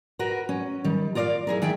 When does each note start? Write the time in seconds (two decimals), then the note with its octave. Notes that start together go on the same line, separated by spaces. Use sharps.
0.19 F#4 A#4 B4
0.49 C#4
0.84 D#3 G3
1.15 F4 A#4 D5 D#5 F5
1.47 E4 G#4 A#4
1.62 D#3 G#4 E5 G5 A5